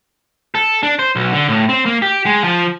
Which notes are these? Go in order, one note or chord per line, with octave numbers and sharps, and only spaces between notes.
A4
D4
C5
B1
D3
A2
C4
A#3
G4
G#3
F3